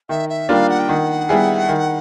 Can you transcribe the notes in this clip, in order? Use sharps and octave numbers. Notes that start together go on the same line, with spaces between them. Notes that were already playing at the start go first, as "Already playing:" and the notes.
D#3 E5
E5
G3 A#3 D4 F4 F5
F#5
G5
D#3 F#5
G3 B3 E4 G#4
D#3